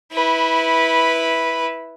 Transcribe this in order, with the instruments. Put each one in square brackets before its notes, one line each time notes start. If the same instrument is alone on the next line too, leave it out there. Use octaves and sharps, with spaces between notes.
[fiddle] E4 B4